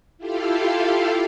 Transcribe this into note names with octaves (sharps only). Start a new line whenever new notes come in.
E4 F4 G4 A4 F5